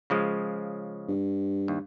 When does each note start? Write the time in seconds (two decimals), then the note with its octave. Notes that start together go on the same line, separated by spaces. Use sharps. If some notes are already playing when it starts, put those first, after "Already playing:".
0.10 C#3 F3 G#3
1.09 G2
1.68 D#2